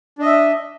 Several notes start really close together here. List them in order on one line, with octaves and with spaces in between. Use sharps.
D4 D#5 E5